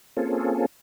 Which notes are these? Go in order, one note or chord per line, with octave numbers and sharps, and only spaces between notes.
A#3 C4 C#4 F4 G#4 A4